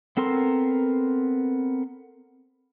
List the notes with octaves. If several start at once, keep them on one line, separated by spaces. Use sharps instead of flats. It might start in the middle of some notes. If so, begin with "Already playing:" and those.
B3 C4 A4 A#4 C6